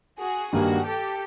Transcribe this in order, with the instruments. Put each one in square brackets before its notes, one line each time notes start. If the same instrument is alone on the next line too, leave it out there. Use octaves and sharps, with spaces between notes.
[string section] F#4 G#4
[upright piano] G2 D#3 G3 A#3 [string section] F#4 G#4
[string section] G4 A4